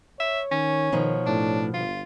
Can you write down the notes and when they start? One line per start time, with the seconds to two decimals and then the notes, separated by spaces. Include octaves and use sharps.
0.20 C#5 E5
0.51 D#3 C#4
0.92 B2 D#3 F3 D#4
1.27 A2 D4
1.74 G1 F4